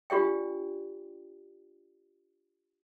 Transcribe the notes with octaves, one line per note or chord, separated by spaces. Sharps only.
D4 F4 G4 D5 G5